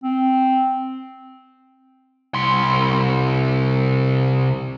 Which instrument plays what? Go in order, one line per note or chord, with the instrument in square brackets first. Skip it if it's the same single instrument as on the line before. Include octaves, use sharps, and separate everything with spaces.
[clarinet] C4
[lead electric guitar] C2 C6